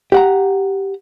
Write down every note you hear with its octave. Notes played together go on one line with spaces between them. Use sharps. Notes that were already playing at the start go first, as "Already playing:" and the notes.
G4 F#5 A#5